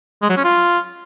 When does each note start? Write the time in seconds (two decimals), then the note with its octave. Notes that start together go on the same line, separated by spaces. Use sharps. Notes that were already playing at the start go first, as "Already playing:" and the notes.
0.22 G#3
0.30 F#3
0.37 C#4
0.44 F4